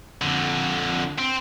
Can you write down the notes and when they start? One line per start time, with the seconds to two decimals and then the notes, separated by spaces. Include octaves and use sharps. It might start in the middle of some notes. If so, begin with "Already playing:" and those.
0.22 F2 D3
1.19 C4